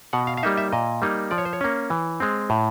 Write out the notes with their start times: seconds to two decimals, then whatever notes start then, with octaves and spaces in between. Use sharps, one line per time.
0.13 B2 F#5
0.27 F5
0.37 F5
0.43 G3 A#3 D#4 E5
0.57 E5
0.73 A#2 D#5
1.02 G3 A#3 D#4
1.31 F3 D5
1.38 C#5
1.45 C5
1.53 C#5
1.61 A#3 C#4
1.90 E3
2.20 G#3 C4
2.50 A2